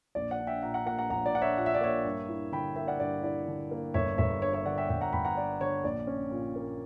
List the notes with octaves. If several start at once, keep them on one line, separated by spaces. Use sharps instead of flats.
A#1 D5
D5 F#5
D4
E5 G5
A#2 F#5 A#5
F#5 A#5
A#3 F#5 A#5
F#5 A#5
A#1 F#5 A#5
D5
D4 F#5
C#5 E5
A#2 F#5
E5
D5
A#3 C#5 E5
G2
E4
D3 G5 B5
A#3 E5 G5
D5 F#5
G2 D5
E4 D5
D3
A#3
G1 C#5 E5
G1 C#5 E5
G2 C#5
C#5 E5
D3 D5 F#5
E5 G5
G1 E5 G5
F#5 A#5
G1 G5 B5
F#5 A#5
G2 D5
D3 C#5
A#1 D5
C#4
A#2
A#3